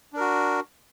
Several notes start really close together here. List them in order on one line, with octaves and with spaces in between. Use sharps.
D4 A#4 F#4